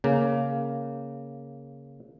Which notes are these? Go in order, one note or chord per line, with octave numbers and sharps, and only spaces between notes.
C#3 A#3